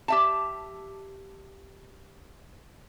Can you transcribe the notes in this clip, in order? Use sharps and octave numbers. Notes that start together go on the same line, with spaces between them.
G4 E5 A5